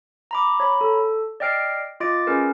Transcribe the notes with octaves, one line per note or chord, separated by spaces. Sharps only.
A#5 B5 D6
C#5 A#5 B5
A4
D5 D#5 G5 F6 C7 D7
F4 D#5 D6 A6 D7
C#4 G#4 A#4 B4